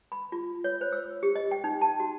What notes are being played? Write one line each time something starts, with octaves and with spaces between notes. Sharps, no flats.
B5
F4
C#5
C5
E6
G4
D#5
G5
D#4
A5
F#4